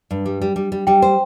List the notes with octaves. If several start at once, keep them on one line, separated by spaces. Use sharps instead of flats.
G2
G3
G3
G3
G3
G3 G5
C5